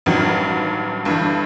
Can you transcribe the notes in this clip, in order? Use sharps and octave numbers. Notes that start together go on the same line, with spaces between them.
A1 G2 D#3 F#3
G1 G2 E3